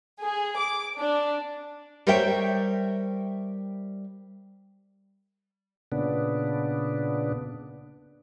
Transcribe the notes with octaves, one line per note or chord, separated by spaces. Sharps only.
G#4
D6
D4
G3 A#4 C5 C#5 E5 G5
A#2 C#3 B3 D4